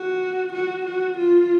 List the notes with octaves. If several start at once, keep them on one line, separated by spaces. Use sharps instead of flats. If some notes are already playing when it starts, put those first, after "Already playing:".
Already playing: F#4
F#4
F#4
F4